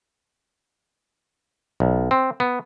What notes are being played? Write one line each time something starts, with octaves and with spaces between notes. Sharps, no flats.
B1
C4
B3